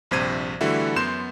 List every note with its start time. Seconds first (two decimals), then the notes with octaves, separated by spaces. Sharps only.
0.11 A#1 G2 C3 C5 G#6 D#7
0.61 D3 E3 G3 A3 E4 F#4
0.96 F#2 B3 C6 G6 E7